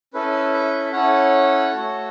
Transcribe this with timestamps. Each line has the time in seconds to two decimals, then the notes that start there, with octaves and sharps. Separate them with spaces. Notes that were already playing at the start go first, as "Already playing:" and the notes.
0.14 C#4 E4 A4 B4
0.53 B4 E5
0.92 C#4 E4 A4 C#5 F#5
1.72 A3 F#4 A4